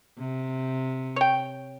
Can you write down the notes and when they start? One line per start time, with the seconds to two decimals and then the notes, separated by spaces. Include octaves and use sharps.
0.19 C3
1.16 C#5 G5